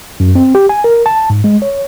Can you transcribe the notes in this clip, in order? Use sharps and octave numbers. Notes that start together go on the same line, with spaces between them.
F#2
C4
G4
G#5
A#4
A5
G#2
G#3
C#5